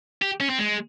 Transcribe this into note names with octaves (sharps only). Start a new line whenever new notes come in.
G4
C#4
C4
G#3